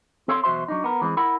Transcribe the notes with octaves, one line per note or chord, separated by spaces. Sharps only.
C4 A4 C#5 F5 A5 C6
B1 E2 F#4 C5 E5 C6
F#3 D4 D#4
B3 A#4
E3 G#3 C4
E4 A#4 F#5 B5